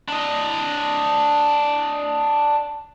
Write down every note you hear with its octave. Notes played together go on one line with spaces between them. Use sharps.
D4 D#5